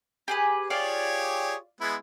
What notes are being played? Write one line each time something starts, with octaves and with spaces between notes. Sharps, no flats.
G4 G#4 B4
F4 G4 G#4 C#5 D5
G#3 B3 E4